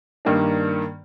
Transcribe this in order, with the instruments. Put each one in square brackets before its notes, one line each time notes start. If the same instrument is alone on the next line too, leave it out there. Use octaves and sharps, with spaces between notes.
[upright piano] G2 D#3 A#3 D4